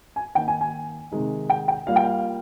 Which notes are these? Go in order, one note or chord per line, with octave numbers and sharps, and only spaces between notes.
G#5
D#3 A#3 D#4 G5
G#5
G#5
C3 D#3 G#3 D#4
G5
G5
G3 A#3 F4 F5
G5
F5